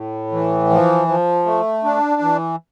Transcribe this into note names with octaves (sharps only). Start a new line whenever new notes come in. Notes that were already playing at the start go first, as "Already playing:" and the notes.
Already playing: A2
E3
F3
F3
A3
D4
E3